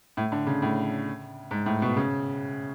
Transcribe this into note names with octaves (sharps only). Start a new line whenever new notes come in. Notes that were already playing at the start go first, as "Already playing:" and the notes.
A2
D3
C#3
A2
G#2
A2
B2
C#3